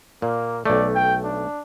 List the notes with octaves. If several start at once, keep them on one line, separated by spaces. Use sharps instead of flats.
A#2 A#3
B1 A3 D5
G5
D4